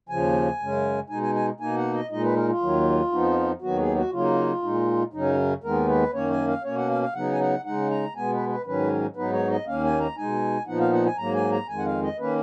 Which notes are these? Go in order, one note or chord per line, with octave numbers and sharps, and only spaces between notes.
D#2 C#3 F3 G#5
F#2 C#3 G#3 C#4
B2 G#3 D#4 G#5
G#5
G#5
B2 A#3 D#4 G#5
F#5
D#5
A#2 G#3 D#4 D#5
B4
A#4
F4
D#2 D#3 F#3
F2 F3 B3 D#4
D#2 D#3 F#3 B3 F#4
G#4
F#4
C#3 F#3 A#3 D#4 F4
A#2 G#3 D#4
F#2 C#3 F#3 C#4 D#4
D#2 D#3 G#3 B3 A#4
B4
F#2 D#3 A#3 C#4 C#5
G#5
F5
B2 A#3 C#4 C#5
F#5
F5
F5
C#3 F#3 B3 D#4 F#5
G#5
F#5
C#3 G#3 D#4 F#5
A#5
B2 G#3 B3 G#5
B4
B4
G#2 D#3 F#3 C#4 B4
G#2 F#3 B3 D#4 B4
C#5
D#5
D#2 D#3 A#3 C#4 F5
G#5
A#5
B2 G#3 D#4 G#5
A#2 F3 B3 D#4 F#5
F5
F#5
G#5
G#2 F#3 A#3 A#5
G#5
A#5
F2 D#3 G#3 G#5
F#5
F5
D#5
D#3 A#3 C#4 B4